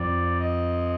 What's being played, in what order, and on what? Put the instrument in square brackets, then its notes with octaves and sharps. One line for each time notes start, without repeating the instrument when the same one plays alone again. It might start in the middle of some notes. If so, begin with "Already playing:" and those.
Already playing: [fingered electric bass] F2 [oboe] D5
[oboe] D#5